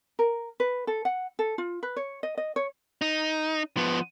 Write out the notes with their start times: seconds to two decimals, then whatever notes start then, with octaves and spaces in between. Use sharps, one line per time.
0.19 A#4
0.60 B4
0.87 A4
1.05 F#5
1.39 A4
1.58 F4
1.83 B4
1.97 C#5
2.23 D#5
2.37 D#5
2.56 C#5
3.02 D#4
3.77 F3 B3